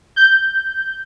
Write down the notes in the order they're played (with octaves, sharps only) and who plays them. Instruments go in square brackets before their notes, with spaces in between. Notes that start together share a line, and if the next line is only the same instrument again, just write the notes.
[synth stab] G6